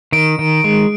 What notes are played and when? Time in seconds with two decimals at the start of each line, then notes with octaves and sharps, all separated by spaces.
0.12 D#3 D7
0.39 D#3
0.64 G#3